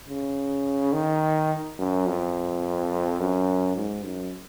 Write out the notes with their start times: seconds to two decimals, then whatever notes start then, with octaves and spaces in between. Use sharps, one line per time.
0.09 C#3
0.93 D#3
1.78 F#2
2.07 F2
3.20 F#2
3.77 G#2
4.05 F#2